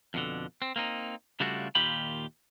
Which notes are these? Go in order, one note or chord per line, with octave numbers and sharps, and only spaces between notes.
F2 B2 D3
C4
A#3 C4 D#4
C#3 G3 A3 D4 F4 F#4
D#2 A#2 D#3 F4 G4 B5